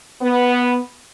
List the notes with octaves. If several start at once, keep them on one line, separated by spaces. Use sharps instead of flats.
B3